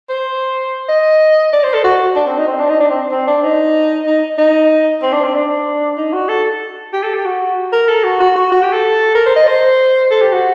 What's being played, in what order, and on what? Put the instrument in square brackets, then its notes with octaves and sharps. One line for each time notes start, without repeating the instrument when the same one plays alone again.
[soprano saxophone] C5
D#5
D5
C5
A4
F#4
D4
C4
D#4
C4
D4
D#4
D4
C4
C4
D4
D#4
D#4
D#4
C4
D4
C4
D4
D#4
F#4
A4
G4
A4
G4
F#4
A#4
A4
F#4
F#4
F#4
F#4
G4
A4
A#4
C5
D#5
C5
A4
G4
F#4